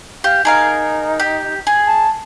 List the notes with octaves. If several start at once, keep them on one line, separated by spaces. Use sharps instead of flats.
G4 F5
D#4 G#4 A#4 F5
G4
G#4
A5